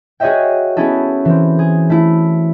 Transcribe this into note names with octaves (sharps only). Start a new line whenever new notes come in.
F#4 G#4 C#5 D#5 E5 G5
B3 C#4 E4 G#4 A4
E3 C4
G#4
A3 E4